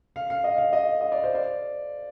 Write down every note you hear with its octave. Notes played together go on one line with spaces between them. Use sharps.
F5
F5
D#5
F5
D#5
D#5
D5
C5
D5